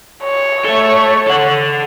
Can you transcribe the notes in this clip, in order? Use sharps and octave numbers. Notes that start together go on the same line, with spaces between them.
C#5
A4 E5
A4 F#5